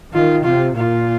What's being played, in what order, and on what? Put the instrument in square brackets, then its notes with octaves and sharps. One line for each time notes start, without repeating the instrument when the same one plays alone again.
[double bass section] D#3 [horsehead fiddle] F4
[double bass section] C3 [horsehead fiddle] F4
[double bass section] A#2 [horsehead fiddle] F4